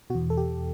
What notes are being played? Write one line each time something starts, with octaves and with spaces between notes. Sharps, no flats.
B2 F#4
E2
A4
G4